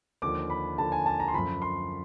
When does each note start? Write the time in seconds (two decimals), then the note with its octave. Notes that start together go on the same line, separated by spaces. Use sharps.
0.22 D#2 D3 F3 D6
0.50 B5
0.78 D#2 D3 F3 A5
0.92 G#5
1.06 A5
1.20 A#5
1.28 C6
1.34 F#2 D3 F3 B5
1.62 C6